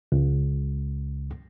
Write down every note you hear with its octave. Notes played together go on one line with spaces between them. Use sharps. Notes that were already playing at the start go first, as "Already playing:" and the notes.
C#2